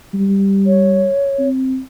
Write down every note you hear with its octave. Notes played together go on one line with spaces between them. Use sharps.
G3
C#5
C4